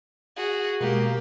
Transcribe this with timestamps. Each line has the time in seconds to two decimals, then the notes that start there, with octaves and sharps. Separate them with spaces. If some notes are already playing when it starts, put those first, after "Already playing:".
0.37 F#4 G#4
0.81 B2 G#3 A#3 G4